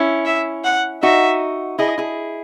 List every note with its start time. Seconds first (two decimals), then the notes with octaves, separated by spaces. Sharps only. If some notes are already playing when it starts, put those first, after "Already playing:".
Already playing: C#4 E4
0.26 E5
0.64 F#5
1.03 D#4 F#4 E5
1.79 E4 G#4 D#5
1.98 E4 G#4